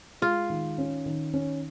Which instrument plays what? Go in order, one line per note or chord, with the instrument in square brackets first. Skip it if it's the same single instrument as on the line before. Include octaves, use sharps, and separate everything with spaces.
[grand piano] G#3 [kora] F4
[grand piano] D#3
C#4
D#3
C#4